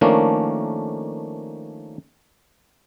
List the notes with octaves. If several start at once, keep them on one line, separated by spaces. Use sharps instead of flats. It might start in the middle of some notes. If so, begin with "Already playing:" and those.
D#3 F3 A3 A#3 C#4 D4